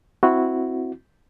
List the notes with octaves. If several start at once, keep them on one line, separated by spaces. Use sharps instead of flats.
C4 E4 F#4